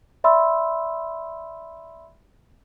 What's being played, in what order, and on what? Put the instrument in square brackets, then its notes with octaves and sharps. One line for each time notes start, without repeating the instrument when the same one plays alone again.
[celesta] D5 E5 B5 C6 E6